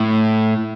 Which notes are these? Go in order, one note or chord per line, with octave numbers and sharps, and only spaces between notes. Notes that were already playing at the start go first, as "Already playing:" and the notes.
Already playing: A2